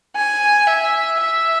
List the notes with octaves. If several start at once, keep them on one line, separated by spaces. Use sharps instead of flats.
G#5
E5
E5